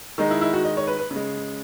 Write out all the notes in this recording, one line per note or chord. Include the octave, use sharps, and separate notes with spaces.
D#3 G#3 D#4
E4
E4
F#4
D#5
C#5
B4
B4
C#3
G#3